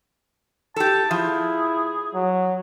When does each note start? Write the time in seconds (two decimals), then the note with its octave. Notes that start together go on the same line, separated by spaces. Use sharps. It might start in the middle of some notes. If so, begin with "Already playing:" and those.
0.76 G4 A4 A5
1.11 F3 E4 G#4
2.14 F#3